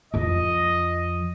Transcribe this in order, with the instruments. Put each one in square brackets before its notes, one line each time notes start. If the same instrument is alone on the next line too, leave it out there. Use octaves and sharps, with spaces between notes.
[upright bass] F2 F3 [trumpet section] D#5